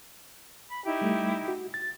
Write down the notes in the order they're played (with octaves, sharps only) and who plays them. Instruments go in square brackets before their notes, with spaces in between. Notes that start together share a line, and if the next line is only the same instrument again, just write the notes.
[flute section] B5
D#4 E4 G4
[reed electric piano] G3 A3
F#4
A6